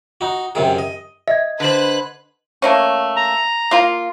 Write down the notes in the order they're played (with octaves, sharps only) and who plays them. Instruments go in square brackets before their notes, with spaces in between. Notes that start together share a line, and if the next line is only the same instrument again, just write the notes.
[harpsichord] D#4 F#4
F#2 C3 D#3 G#4
D#5
[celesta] D#5 G#6 [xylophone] E5
[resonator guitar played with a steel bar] D3 C5 [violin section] B4 F#6
[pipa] A3 A#3 C#4
[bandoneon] A#5
[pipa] A#3 F4